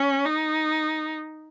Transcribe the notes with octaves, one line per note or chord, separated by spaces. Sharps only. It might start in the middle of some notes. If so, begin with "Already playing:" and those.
Already playing: C#4
D#4